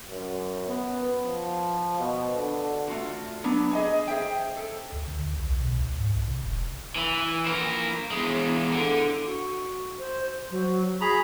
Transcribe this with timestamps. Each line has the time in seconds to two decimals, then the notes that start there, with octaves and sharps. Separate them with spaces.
0.10 F#2
0.67 B3
1.26 F3
1.99 B2
2.35 D3
2.88 A3 F4 F#4
3.44 F#3 B3 D4
3.73 G#4 D#5 G#5
4.08 G#4 C5 E5 G5
4.57 A4
4.92 D2
5.07 D3
5.24 D2
5.37 B1
5.61 B2
5.77 C#2
5.98 G#2
6.15 B1
6.28 C3
6.42 E1
6.96 E3
7.46 F3 A#4
8.11 E2 G#3
8.72 D3
9.26 F#4
9.99 C5
10.51 F#3
11.01 F#4 G#4 A#5 B5